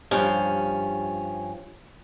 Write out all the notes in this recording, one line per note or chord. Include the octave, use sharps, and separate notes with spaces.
G2 F3 C#4